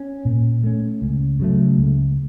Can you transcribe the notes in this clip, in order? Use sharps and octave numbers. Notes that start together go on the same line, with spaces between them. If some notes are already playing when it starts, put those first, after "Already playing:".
Already playing: C#4
A#2
A3 C#4
C#2
C#3 F#3 A3
C#2